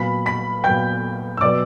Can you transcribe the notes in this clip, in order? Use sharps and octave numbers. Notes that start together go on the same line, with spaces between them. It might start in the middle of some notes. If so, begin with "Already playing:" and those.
Already playing: A#2 F#3 B3 B5 B6
B5 B6
A#2 F#3 B3 G5 G6
E6
B2 F#3 B3 D5 D6